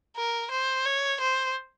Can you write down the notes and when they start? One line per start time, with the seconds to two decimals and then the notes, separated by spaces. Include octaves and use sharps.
0.16 A#4
0.51 C5
0.85 C#5
1.20 C5